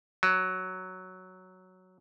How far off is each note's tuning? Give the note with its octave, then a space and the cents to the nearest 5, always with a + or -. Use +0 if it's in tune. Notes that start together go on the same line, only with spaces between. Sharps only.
F#3 +0